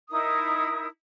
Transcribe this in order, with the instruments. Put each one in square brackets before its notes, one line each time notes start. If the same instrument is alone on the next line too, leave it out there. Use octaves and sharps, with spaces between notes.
[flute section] D#4 E4 A#4 D#6